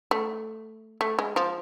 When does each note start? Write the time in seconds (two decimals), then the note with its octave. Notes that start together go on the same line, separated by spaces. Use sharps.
0.11 A3
1.01 A3
1.19 G#3
1.36 F3